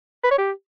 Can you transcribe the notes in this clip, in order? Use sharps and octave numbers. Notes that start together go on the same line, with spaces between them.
B4
C#5
G4